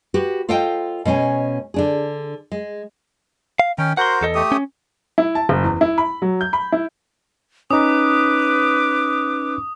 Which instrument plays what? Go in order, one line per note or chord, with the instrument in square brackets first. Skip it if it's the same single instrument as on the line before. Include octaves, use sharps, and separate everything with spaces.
[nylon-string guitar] F#4 G4 B4
F4 A4 C5 D#5 F5 G5
B2 G#3 C#4 G#5
D3 D4 G#4
G#3
[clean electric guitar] F5
[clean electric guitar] D#3 [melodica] C#4 G5
[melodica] F#4 A#4 C5 [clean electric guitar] F#5 C6
[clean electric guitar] E2 A4 D#5
[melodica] A3 G4 D#6
[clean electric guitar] C#4
[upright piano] E4
A5
F#1
E2
E4
B5
F#3
G6
B5
E4
[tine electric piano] C#4 D#4 [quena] B4 [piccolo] D6 [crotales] D#6